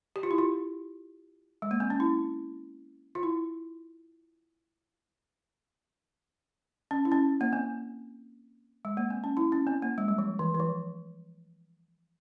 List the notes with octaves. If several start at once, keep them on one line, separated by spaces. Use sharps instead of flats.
G4
F4
E4
F4
G#3
A#3
C4
C#4
E4
F4
E4
C#4
E4
C#4
A#3
C4
G#3
A#3
C4
C#4
E4
C#4
C4
A#3
G#3
G3
F3
E3
E3
F3